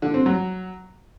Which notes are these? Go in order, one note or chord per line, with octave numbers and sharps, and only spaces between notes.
D3
C4
F#3